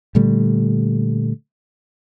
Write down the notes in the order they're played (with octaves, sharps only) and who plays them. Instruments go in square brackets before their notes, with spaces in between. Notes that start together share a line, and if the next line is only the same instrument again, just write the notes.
[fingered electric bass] A#2 D3 G3 A3